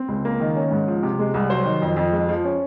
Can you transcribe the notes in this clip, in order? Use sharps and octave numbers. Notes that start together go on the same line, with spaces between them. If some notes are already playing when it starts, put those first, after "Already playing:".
Already playing: C4
C#2
A#3
D#3
C#4
G#2
F3
C3
G#3
C2
F#3 C5
D#3
F2
F2
G#3
F3
C#4